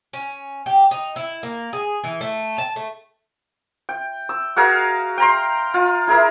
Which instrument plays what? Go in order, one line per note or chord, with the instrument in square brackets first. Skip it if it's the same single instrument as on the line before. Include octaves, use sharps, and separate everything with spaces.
[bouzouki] C#4
G4
D#4
E4
A#3
G#4
E3
A3
A5
A3
[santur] G5
E6
F#4 G#4 A#4 F5
G5 A#5 C6
F4
E4 G#4 A#4 E5